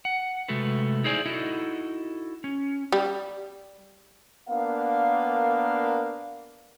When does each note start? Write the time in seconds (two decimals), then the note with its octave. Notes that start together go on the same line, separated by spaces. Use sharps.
0.05 F#5
0.49 C3 G#3 A3 F#4 A4 B4
1.04 D#4 E4 G#4 C5 D5 G#5
1.26 D#4 E4 F#4 A4 D#5
2.44 C#4
2.92 G3
4.49 A#3 B3 D4 A#4 F5